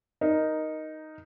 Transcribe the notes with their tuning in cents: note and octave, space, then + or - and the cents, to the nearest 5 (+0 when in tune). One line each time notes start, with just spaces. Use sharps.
D#4 +0 A#4 +10